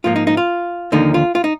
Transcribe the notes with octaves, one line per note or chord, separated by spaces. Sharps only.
G#2 F3 A#3 F4
D#4
D#4
F4
D#2 D3 F3 A#3 D#4
F4
F4
D#4